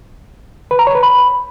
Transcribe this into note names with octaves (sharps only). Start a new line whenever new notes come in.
B4
A#5
C#5
B4
B5